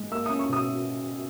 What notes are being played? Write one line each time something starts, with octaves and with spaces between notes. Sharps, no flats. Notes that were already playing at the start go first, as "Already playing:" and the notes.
Already playing: G#3
A#3 E6
D#6
C#4
C#6
B2 D#6